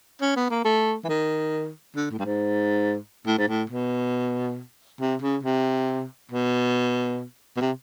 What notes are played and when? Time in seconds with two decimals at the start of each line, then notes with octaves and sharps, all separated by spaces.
0.21 C#4
0.36 B3
0.50 A#3
0.65 A3
1.04 E3
1.09 D#3
1.96 D3
2.11 A2
2.19 G2
2.25 G#2
3.27 A2
3.38 G#2
3.48 A2
3.70 B2
5.01 C3
5.22 C#3
5.43 C3
6.32 B2
7.57 B2
7.61 C3